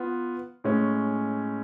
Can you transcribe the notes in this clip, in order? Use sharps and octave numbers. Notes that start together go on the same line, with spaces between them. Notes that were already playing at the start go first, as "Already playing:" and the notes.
Already playing: B3 F4
A2 G#3 C#4